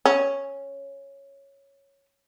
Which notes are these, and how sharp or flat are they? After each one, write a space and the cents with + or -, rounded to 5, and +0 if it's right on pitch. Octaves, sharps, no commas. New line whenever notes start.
C#4 -5